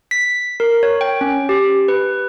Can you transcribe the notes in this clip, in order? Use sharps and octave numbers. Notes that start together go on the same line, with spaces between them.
B6
A#4
C#5
G5
C#4
G4
B4